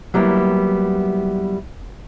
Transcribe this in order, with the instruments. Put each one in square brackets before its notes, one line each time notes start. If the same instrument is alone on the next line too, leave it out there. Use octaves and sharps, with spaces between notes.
[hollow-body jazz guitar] F#3 G3 A#3 B3 E4